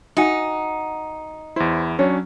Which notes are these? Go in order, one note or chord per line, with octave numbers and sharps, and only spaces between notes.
D#4 F#4 F#5 G#5
E2 E4 C5
F#3 C#4 D4 C#5